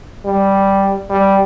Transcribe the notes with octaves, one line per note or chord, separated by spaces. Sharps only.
G3
G3